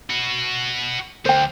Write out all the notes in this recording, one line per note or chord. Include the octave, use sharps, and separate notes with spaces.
F#4 B4
D2 C5 G5